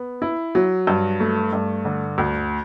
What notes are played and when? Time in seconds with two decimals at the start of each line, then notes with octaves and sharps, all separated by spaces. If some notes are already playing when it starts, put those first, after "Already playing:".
Already playing: B3
0.22 E4
0.55 F#3
0.87 G2
1.20 A3
1.53 G2
1.85 D3
2.18 D2